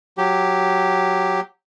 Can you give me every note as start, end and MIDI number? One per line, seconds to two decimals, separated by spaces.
0.18 1.40 54
0.18 1.40 67